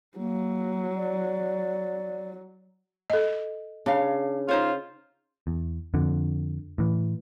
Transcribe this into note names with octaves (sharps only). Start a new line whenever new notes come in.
F#3 A#3
D5
A4 D#5
C#3 D4 F5
D#4 F4 C5 C#5
E2
F2 D3
A2 E3